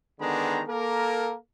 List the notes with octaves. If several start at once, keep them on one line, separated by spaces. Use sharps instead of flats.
D3 D#3 G#3 B3 D4 A#5
A#3 A4 A#4